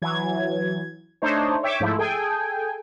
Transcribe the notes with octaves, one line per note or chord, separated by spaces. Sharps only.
E3 F#3 G#6
A3 D4 D#4 C5 C#5
C#5 E5 G5 D6
G#2 F3 A3 E4
G#4 A4 G5 G#5